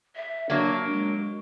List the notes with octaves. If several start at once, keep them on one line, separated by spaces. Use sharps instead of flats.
E5
F#3 A#3 D4
G#3